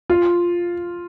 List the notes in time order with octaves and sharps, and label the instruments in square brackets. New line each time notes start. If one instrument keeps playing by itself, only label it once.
[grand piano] F4